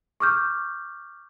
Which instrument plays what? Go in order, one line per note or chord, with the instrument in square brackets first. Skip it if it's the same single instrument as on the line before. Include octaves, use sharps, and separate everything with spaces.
[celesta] C#6 D6 F6 G6